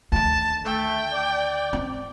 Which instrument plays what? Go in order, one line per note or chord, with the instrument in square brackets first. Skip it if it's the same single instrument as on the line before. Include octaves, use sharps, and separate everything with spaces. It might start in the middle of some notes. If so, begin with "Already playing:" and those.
[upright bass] D2 D#3 [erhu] A5
[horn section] A3 [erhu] G5
[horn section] D5
[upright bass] C4